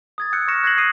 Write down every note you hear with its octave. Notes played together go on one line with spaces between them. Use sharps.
D#6 G#6 A6
D#6 E6 F#6 G6 C#7
C#6 F6 A#6 C#7 E7
F#6 G#6 A#6 C7 F#7
D#6 C7 D#7